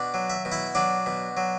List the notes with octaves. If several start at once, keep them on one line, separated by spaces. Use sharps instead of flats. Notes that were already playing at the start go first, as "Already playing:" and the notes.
Already playing: B2 D4 D5
F#3
E5
B2
E4 E5
F#3 D4 D5
B2
F#3